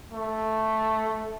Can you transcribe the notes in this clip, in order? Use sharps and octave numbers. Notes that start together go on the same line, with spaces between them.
A3